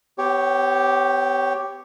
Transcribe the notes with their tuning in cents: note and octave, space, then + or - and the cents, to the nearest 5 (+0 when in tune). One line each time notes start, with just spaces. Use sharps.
B3 +40 G4 +0 C#5 +0